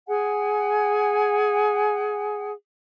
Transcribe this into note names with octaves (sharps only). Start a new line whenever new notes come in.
G#4 F#5 G#5